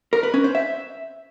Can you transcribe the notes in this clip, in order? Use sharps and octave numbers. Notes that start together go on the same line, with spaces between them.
A#4
B4
C#4
C5
E5